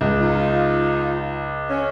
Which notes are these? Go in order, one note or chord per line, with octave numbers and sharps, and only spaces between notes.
C#2
D#4 F4
C#4